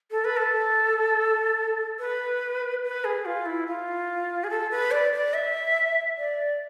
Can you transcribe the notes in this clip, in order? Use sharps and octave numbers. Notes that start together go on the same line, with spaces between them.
A4
B4
A4
B4
B4
G#4
F4
E4
F4
G#4
A4
B4
D5
D5
E5
D5